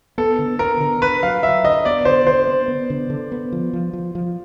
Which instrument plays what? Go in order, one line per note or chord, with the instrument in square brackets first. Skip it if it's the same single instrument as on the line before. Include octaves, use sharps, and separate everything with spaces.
[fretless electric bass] B3 [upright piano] A4
[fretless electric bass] D3
[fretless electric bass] B3 [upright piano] A#4
[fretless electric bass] D3
[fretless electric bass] D3 [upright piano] B4
[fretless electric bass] F#3 [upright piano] F5
[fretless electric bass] F#3 [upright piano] E5
[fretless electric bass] D3 [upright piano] D#5
[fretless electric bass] B3 [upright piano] D5
[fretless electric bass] D3 [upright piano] C5
[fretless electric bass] D3 [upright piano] C5
[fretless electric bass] B3
B3
D3
D3
B3
F3
F3
F3
F3